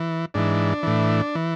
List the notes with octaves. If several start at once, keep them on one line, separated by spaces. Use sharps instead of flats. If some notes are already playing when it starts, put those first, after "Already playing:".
Already playing: E3
G#2 E3 D4
A2 E3
E3